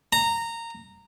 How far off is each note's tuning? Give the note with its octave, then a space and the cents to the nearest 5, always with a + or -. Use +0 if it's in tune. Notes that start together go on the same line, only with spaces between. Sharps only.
A#5 -15